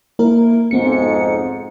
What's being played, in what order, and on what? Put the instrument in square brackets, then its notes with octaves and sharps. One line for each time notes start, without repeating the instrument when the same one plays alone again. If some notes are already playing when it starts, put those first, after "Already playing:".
[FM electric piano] A#3 E4 A#4
[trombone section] B1 F2 G#2 [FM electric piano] B3 C4 C#7